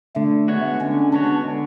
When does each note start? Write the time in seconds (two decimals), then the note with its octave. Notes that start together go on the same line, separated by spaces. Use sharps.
0.16 D3 A3
0.48 G#3 B3 F#4 C#5
0.81 D3 C#4
1.13 G#3 B3 D4 F#4 C#5
1.45 D3